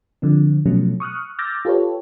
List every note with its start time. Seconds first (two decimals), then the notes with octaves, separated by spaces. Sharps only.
0.22 D3 F3 C4
0.66 B2 F3 F#3 A3 C#4
1.00 C#6 D#6 F6 F#6
1.39 D6 E6 F6 G6 A6 A#6
1.65 F4 G4 A4 B4 C#5